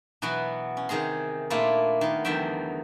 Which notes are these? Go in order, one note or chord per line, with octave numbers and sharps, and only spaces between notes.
B2 E3 F#3 B3 F#4
C#4
C3 D#3 G#4 A#5 C6
A#2 A3 A#3 D4 E4 F4
D#3 B3
E2 D3 D#3 F#3 E5 G5